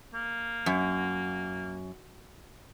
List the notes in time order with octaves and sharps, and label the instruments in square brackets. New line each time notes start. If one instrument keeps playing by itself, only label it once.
[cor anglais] A#3
[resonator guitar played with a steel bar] F#2